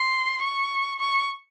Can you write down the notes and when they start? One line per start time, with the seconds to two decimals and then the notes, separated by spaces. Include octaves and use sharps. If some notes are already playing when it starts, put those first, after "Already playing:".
Already playing: C6
0.43 C#6
0.99 C#6